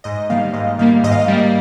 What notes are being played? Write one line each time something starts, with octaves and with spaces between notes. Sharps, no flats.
G#2 D#5
D#3 G3 A#3 F5
G#2 D#5
D#3 G3 A#3 F5
G#2 D#5
F5
D#5
G3 A#3